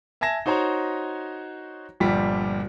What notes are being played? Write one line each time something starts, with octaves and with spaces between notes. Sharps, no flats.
E5 G#5 A5 G#6 A#6 E7
D#4 F#4 C5 C#5 A#5
G1 A#2 F3 G3 G4 B6